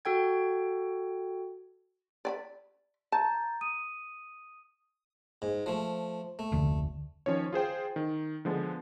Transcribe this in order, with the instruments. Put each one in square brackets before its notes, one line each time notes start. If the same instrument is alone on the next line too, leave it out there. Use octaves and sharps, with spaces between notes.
[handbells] F#4 A4 G5 G#6
[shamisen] D5 G5 B5
[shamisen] A5 [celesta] A#5 G6 A6
[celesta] D#6 D#7
[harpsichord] G#2
F3 A3
A3
[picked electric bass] F1 D2 D3
[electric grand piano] D#3 F3 C#4 C#5
F4 G#4 C5 G5
D#3
D3 F3 G#3 B3